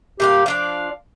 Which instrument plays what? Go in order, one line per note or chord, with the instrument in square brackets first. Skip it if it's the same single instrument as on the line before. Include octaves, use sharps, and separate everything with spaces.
[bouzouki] A#2 G3 F5 [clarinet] G4
[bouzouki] F3 D4 D5 [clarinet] F5